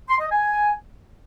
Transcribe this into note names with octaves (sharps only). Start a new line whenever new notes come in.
C6
D#5
G#5